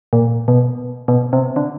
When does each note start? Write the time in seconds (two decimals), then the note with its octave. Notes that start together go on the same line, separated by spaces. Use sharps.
0.13 A#2
0.48 B2
1.08 B2
1.33 C3
1.56 D3